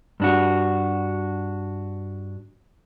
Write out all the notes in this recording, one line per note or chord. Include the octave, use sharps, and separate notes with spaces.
G2 D4 F#4